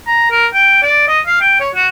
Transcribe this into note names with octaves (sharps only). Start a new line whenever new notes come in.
A#5
A#4
G5
D5
D#5
F5
G5
C#5
F#4